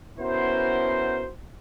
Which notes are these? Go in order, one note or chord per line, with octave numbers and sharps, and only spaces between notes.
B3 C#4 E4 F#4 A#4 C5